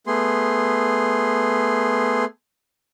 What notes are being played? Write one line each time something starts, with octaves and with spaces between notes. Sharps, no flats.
A3 B3 G#4 C6